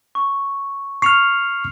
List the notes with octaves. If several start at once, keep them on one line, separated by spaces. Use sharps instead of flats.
C#6
C#6 F6 C7 C#7 F7